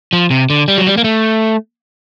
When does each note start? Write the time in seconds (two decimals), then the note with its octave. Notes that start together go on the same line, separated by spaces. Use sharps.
0.13 F3
0.31 C3
0.50 D3
0.68 G3
0.78 F#3
0.86 G3
0.97 A#3
1.04 A3